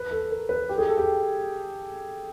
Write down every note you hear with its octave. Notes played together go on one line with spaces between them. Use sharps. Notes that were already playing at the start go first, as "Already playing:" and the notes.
Already playing: B4
A4
A#4
B4
G4
G#4
A4
G4